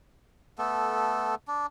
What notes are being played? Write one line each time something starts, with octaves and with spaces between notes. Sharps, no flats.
A3 B3 A4
D4